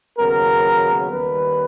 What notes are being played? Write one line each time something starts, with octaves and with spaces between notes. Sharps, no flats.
D#2 C#3 F#3 B3 A#4
D#2 D#3 G3 B4